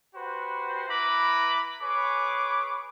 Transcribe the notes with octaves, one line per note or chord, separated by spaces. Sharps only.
F#4 G4 B4 C5
E4 B4 A#5 B5 D6
G#4 B4 C#5 D6